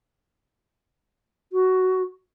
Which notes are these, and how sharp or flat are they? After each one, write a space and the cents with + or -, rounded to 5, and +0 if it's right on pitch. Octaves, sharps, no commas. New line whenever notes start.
F#4 +15